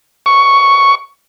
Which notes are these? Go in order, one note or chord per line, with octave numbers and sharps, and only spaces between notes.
C#6